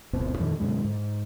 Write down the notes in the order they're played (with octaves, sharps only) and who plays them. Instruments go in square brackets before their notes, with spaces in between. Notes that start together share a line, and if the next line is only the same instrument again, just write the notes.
[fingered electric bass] D1 G1 B2 C4
F2 A#2 D3 D#3
F#2 B2 D3 G#3
G#2